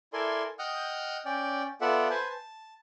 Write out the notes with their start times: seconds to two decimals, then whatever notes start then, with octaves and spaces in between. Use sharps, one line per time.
0.13 E4 A4 A#4 D5 G#5 C6
0.59 D#5 F#5 G5 D#6 F6 G6
1.25 C#4 D5 G5
1.81 B3 F4 A4 D5 E5 F#5
2.10 B4 C5 G#5 A5
2.30 A5